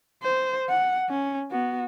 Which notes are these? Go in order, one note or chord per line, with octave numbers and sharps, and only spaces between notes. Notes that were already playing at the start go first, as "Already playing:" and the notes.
C5
F#5
C#4
B3 F#4